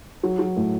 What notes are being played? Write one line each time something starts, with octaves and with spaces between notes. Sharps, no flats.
F#3
F#3
A2